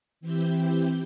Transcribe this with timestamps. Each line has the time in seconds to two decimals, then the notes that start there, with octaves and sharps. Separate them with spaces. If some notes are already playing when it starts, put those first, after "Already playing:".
0.21 E3 C4 E4 G4 G6